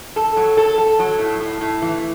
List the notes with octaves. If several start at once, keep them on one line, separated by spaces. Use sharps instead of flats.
A4
F#3
A4
A4
F#3
A2
A2
A2
E3